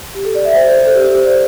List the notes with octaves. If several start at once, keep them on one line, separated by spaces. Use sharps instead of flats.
G4
A4
D5
E5
C5
D5
C5
A4
G4
G4
C5
D5